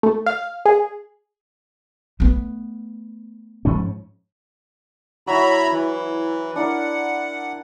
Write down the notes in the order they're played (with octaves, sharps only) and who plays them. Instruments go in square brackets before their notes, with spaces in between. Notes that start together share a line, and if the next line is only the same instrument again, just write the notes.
[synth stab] A3
F5
G#4
[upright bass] A3 B3
[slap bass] G#2 F3 C#4
[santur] F#3 E4 [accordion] E5 A#5 B5
[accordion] E3
[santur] D4 E4 A#4 [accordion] F#5